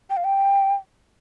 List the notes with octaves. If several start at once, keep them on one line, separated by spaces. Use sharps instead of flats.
G5
F5
G5